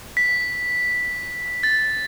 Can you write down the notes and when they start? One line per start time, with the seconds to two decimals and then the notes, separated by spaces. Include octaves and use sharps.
0.17 B6
1.63 A6